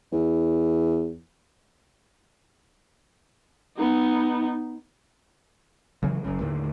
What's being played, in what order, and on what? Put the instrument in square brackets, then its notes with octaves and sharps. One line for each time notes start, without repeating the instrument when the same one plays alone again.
[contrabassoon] E2
[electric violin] B3 D#4
[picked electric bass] C#3 E3 F#3
F#1 F#2 C#3
D#2 A2 D3 D#3